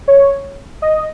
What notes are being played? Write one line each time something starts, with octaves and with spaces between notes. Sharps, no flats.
C#5
D#5